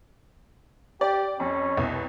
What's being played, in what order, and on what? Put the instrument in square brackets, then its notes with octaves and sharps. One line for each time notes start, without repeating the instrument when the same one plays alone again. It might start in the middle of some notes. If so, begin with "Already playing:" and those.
[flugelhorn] G4 [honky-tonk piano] D5
[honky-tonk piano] F2 [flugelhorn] C#4
[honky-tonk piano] C2 B2